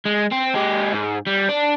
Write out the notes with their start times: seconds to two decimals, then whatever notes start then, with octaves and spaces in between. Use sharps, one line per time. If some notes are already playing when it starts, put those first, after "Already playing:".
0.05 G#3
0.32 C4
0.55 G#3 G4
0.93 G#2
1.27 G3
1.49 D4